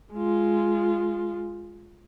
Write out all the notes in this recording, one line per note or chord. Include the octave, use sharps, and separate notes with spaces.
G#3 F4